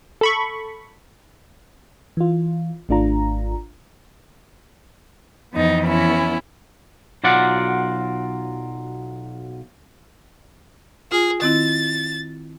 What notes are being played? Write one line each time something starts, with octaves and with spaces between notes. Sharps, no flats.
A4 B5 C#6
E3 F4
G#1 A3 D4 F4 A#5
F2 E3 B3 D#4
B3 C#4 E4
B1 F#3 F4 D5 F#5
F4 G#4
D#3 C4 E4 A6